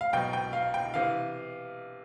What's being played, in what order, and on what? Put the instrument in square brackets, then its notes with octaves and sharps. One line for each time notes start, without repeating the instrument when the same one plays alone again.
[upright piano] F5
B1 B2 G5
G5
F5
G5
C3 E3 F5